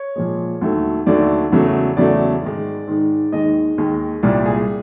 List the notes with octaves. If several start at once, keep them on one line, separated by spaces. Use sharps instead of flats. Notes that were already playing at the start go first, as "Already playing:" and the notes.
Already playing: C#5
A#2 F3 G#3
D#2 D3 F#3 A3
D#2 D3 F#3 A3 D5
E2 C#3 F#3 A3
E2 C#3 F#3 A3 D5
G#2 D#3 G#3
G#2 D#3 G#3
D#2 D#3 G#3 D#5
D#2 D#3 G#3
C2 A#2 G3 D5
G#4